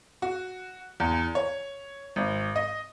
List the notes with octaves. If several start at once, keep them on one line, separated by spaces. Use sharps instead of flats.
F#4
E2
C#5
G#1
D#5